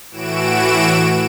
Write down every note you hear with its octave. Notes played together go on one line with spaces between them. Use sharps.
A2 E3 F#4 D7 E7